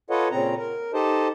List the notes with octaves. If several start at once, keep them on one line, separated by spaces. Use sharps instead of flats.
F4 A4 B4 C#5 D#5 F#5
A#2 C#3 C4 A#5
A#4
D#4 G4 A4 C5 D#5 A5